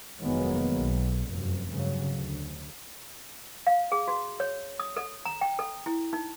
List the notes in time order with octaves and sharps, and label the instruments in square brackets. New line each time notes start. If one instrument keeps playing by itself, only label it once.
[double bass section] F1 D#3 F#3 G#3 A#3 B3
B1
F1 F#2
G2 C#3 F#3
D2
[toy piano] F5
G#4
F#4
C#5
D#6
A4
A#5
G5
A4
E4
D#4